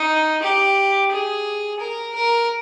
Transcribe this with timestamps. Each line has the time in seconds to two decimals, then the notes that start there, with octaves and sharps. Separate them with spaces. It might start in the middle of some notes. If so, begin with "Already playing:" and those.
Already playing: D#4
0.42 G4
1.11 G#4
1.79 A#4
2.15 A#4